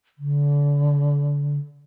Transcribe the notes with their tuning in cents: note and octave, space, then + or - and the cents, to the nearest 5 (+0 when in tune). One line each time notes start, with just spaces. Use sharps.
D3 -30